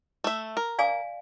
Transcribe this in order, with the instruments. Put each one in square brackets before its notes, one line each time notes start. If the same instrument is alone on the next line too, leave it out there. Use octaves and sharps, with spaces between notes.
[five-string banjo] A3 E5
A#4
[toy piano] D5 F5 G#5